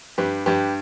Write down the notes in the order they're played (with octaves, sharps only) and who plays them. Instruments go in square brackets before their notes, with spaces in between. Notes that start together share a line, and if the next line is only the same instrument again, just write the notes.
[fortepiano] G2 G4 B4
G2 G4 B4